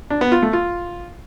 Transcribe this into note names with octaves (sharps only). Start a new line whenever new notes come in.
D4
B3
F4
A3
F4